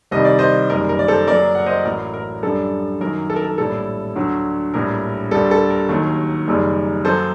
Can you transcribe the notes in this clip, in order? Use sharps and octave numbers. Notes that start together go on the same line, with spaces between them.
C2 C3 D#3 G3 D#5
D5
C5 D#5
F#1 F#2 D#3 G3 A#4
A#4
D5
A4 C5
F#1 F#2 F#3 A#4 D5
F#5
C5 D#5
A1 A2 F#3 A#4
A#4
F#2 D3 G3 A4
F#2 D#3 F#3 A#4
A4
A#4
A4
A#1 A2 G3 A4
D2 D3 F#3
A#1 A2 G3 A#4
D2 D3 G3 A4
A4
A#4
D#2 D#3 F#3
F#1 F#2 D#3 G3
F#2 F#3 A4 C5